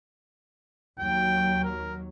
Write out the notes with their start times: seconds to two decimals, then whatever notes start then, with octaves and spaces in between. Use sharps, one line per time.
1.00 D#2 F#3 G5
1.64 A#4